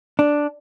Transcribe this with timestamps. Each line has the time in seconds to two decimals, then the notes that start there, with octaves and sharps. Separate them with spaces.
0.19 D4